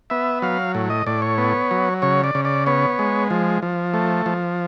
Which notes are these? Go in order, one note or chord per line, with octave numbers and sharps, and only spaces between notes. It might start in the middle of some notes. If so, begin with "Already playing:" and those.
B3 E5
F#3 F5
A2
D#5
A2 D5
C#5
B3
F#3
C#3 C#5
D5
C#3
D5
B3 C#5
G#3
F3
F3
A3
F3